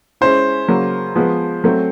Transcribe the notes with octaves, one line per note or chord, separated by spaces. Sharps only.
G#3 C#4 E4 C5
C#3 F#3 A#3
F3 G#3 B3
F#3 A3 C4